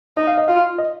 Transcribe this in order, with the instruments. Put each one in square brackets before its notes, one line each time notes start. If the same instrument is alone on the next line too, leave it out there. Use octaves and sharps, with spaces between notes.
[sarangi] D#4 [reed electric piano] D#5
[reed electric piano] F5
D#5
[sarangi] F4 [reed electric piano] F5
[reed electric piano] D#5